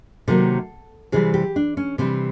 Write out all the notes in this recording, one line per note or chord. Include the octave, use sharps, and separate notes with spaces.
C3 D#3 F#3 A#3 A4
C3 E3 G3 G#4
G4
D4
C#4
C3 E3 G3 C4